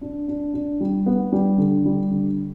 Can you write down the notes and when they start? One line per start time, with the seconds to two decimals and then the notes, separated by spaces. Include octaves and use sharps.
0.01 D4
0.28 D4
0.53 D4
0.81 G3
1.06 B3
1.32 G3
1.58 D3
1.85 G3
2.11 D3